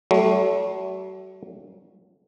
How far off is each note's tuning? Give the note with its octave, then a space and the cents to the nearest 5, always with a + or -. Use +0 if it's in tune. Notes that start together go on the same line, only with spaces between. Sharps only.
F#3 +40 A3 -10